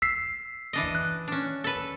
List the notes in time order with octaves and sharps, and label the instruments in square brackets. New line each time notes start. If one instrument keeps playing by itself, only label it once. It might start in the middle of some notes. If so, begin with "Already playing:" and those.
[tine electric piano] E6 B6 C7
[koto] E3 D4 D#5
[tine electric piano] F#6
[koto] C#4 D4
A4 B4